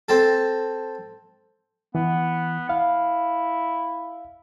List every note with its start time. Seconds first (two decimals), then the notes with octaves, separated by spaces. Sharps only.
0.09 C4 A4
1.95 E3 B3
2.69 E4 F5